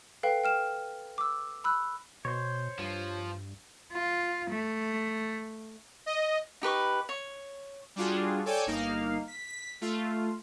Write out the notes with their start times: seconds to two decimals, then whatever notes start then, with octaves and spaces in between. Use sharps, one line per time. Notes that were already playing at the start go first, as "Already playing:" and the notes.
0.23 A4 B4 F5 G5
0.44 G5 F6 E7
1.18 D6 E6
1.64 B5 E6 F#6
2.25 B2 C5 C#5
2.79 G2 F3
3.92 F4
4.50 A3
6.06 D#5
6.62 D#4 G4 B4 C#6
7.09 C#5
7.96 G3 D4 F4 F#4 G#4
8.46 A4 C#5 D5 G5 G#5
8.67 G1 A#3 D#4 F5
9.28 B6
9.81 A3 F4